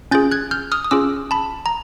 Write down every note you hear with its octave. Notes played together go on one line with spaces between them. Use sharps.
C#4 F4 G#4 G6 A6
F#6 G#6
F6 G6
D#6 F6
D#6
C#4 F4 G#4 D6 E6
A5 B5
A#5